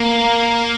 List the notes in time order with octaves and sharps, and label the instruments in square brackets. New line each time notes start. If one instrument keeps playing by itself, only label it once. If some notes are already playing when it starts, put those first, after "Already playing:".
Already playing: [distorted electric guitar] A#3